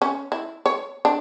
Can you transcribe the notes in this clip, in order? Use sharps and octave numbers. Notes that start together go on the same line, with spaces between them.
C#4
E4
C#5
D4